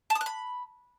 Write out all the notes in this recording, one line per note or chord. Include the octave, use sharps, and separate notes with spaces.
A5
D#6
F#6
B5